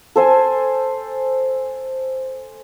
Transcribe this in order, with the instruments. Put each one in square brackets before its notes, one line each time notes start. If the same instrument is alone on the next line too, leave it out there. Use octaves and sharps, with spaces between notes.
[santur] A4 C5 G#5